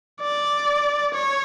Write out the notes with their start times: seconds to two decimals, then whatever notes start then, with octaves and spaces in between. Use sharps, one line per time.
0.21 D5
1.14 C#5